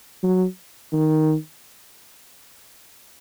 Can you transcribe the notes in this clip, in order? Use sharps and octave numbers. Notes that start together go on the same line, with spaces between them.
F#3
D#3